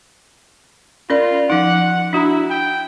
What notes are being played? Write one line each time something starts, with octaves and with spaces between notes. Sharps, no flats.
C#4 F4 A#4 D5
F3 D#4 F#5
D4 E4 F#4 A#5
G5